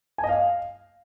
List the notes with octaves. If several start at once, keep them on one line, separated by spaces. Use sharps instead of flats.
G#5
D#5
F5